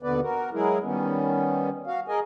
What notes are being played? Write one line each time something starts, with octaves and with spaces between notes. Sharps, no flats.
D#2 B2 D3 B3 B4 D5
F#4 A#4
F#3 G#3 E4 G#4 A#4
D#3 G3 B3 C#4
F#4 F5
G#4 A#4 D#5 G#5